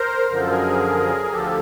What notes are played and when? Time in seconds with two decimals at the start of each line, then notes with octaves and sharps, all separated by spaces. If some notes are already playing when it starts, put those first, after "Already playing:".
Already playing: A#4 C5
0.31 F#2 D3 F3 A#4
0.40 A4
0.50 G#4 A#4
1.24 A#4
1.32 D2 D3 F3 G4 A4